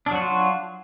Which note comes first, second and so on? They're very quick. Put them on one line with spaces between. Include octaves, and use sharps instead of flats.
D4 F#3 F#4 F4